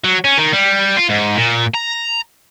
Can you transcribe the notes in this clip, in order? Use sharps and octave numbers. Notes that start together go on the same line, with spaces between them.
F#3
C#4
D#3
G3
F4
G#2
A#2
A#5